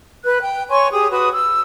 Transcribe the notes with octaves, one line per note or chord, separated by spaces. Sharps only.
B4 F#6
G5
C#5 G#5 C6 C#6
G4 G#4 D#6
F#4 B4 D#6
E6